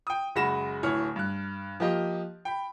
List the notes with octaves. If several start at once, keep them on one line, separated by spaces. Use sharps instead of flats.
G5 D#6
F#1 G#3 F#4 B5 A#6 E7
D1 E4 C#5 F6
G2 F#6
F3 A#3 G4 D#5
G5 B5